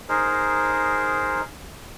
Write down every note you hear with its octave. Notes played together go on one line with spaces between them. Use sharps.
D#4 G#4 A#4 C5